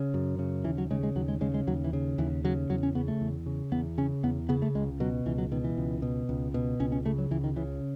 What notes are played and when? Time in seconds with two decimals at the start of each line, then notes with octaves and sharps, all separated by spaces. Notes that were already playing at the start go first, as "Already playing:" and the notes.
Already playing: C#3
0.14 F#2
0.39 C#3
0.64 D#2 E3
0.78 F#3
0.91 C#3 G#3
1.03 G#3
1.16 D#2 F#3
1.28 G#3
1.41 C#3 G#3
1.54 G#3
1.67 D#2 F#3
1.84 E3
1.93 C#3
2.18 D#2 E3
2.44 C#3 F#3
2.70 E2 F#3
2.83 C#4
2.95 C#3 B3
3.08 A3
3.21 E2
3.46 C#3
3.72 E2 B3
3.98 C#3 C#4
4.23 E2 B3
4.49 C#3 B3
4.62 A3
4.75 C#2 G#3
5.00 B2 F#3
5.26 C#2 E3
5.38 F#3
5.52 B2 D#3
5.64 E3
5.77 C#2
6.02 B2
6.29 C#2
6.54 B2
6.80 C#2 C#4
6.92 C#4
7.06 C#3 A3
7.18 F#3
7.31 C#2 E3
7.44 D#3
7.56 C#3 E3